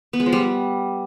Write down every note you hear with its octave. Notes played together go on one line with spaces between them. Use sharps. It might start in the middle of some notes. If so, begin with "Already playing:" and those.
B3
G#3
F3
G3